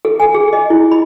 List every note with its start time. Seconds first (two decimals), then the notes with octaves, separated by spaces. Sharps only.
0.05 A4
0.20 G#5
0.34 G#4
0.53 D#5
0.70 E4
0.91 B5